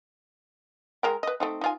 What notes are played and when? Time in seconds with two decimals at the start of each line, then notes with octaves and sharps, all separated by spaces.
1.03 G#3 A#4 G5
1.23 B4 D#5
1.40 A3 C4 D#4
1.61 D#4 F4 G#5